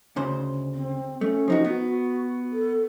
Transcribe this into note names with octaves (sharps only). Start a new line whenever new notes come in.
D2 C#3 C5
C4
A3 C#4
F3 D#4 F#4
B3 F#4
A4